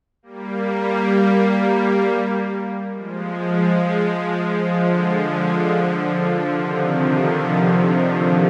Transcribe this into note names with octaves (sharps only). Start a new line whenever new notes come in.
G3 A#3
F3 G#3
D3 F3
C3 D#3